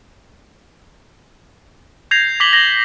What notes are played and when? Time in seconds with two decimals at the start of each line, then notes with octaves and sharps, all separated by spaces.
2.11 G6 G#6 A#6 C7 F7
2.40 D6 A#6 B6 F#7 G7
2.53 A#6 F#7 G7